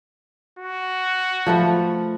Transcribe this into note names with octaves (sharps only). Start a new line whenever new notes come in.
F#4
F3 A3 B4